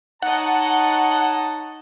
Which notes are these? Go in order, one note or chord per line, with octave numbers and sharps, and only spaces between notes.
D#4 C#5 D#5 F#5 A5